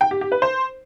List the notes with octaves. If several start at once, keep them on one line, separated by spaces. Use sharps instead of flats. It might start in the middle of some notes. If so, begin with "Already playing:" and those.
G5
G4
G4
B4
C5